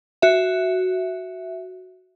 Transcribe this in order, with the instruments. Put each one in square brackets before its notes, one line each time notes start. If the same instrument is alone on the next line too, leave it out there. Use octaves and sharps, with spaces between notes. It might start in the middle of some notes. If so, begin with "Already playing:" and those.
[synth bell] F#4 E5